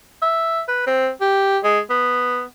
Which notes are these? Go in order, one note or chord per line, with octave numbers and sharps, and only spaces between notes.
E5
B4
C4
G4
G#3
B3